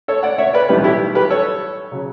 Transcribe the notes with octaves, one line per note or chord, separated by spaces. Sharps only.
A4 C#5
D5 F#5
C#5 E5
B4 D5
B1 A2 E3 G3 G4 B4
E4 G4
G4 B4
A4 C#5
C#3 F#3